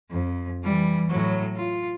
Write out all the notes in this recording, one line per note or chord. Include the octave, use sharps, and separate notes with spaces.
F2
E3 G3
A2 F#3
F4